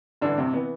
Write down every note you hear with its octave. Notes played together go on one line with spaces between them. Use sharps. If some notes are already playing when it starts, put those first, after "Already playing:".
A1 G2 D3 E3 D4
C3 C4
E3 B3